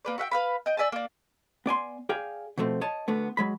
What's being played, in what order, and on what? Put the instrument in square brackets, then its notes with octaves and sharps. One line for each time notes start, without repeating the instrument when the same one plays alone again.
[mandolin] A#3 B4 D5
F#4 E5 F#5 G5
B4 F5 B5
D#5 G5
D5 E5 G#5 A5
A#3 D4
[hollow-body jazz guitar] B3 D5 G#5 C6
G#4 D5 F5 G5
B2 F3 A3 C4
C#5 D#5 A5
D2 D3 A3 B3
F#3 G#3 B5